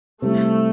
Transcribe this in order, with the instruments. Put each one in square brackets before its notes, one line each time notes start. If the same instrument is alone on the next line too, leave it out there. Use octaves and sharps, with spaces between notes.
[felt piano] C3 G3 C4 E4 [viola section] A3